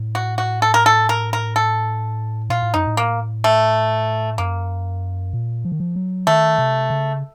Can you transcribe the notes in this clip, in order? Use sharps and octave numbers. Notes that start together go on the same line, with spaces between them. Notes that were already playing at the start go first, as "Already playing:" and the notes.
Already playing: A2
F#4
F#4
A4
A#4
A4
A#4
A#4
A4
A#2 F4
A2
F#2 D#4
A2
A#3
A3
F#2 A#3
A#2
F3
D#3
F3
F#3
D#3 A3
C3
C#3